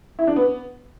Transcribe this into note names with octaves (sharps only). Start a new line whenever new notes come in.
E4
D4
B3